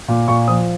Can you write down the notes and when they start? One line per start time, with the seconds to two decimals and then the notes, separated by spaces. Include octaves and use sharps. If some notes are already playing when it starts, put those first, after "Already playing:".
0.08 A#2
0.28 A#2 C#6
0.48 F3 D#6